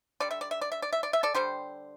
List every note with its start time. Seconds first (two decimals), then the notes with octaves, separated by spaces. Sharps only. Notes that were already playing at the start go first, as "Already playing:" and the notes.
0.20 D3 G3 D5
0.31 E5
0.41 D5
0.51 E5
0.61 D5
0.72 E5
0.82 D5
0.93 E5
1.03 D5
1.13 E5
1.23 A4 D5
1.35 D3 G3 G4 C5